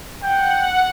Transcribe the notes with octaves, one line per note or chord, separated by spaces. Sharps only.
F#5 G5